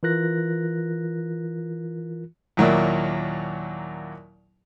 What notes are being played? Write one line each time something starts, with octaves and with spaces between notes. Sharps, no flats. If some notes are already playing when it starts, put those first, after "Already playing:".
E3 F4 A#4 F#6 A#6
D#2 A#2 F#3 A#3 E4 D5